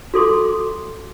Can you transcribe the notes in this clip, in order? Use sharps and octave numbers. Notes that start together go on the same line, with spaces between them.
F#4 A4 C6 D6